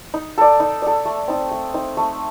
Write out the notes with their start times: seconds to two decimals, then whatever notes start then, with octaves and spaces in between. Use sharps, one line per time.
0.14 D#4
0.38 A4 D5
0.60 D#4
0.82 A4 D5
1.05 A3
1.28 C4 D#4
1.51 A3
1.74 C4 D#4
1.97 A3